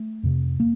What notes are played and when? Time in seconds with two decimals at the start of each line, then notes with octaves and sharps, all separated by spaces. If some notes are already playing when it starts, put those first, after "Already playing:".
Already playing: A3
0.23 F2 C3
0.60 A#3